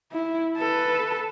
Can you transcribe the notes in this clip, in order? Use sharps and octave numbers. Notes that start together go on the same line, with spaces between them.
E4
A4 B4